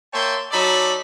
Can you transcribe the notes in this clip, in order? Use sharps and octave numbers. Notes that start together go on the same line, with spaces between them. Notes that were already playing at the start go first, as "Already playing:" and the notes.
A#3 C#5 E5 G5 A5 C6
F#3 D#4 A4 D5 A5 B5